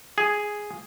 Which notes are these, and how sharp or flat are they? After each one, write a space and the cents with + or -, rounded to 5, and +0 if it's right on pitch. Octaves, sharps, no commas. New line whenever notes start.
G#4 +0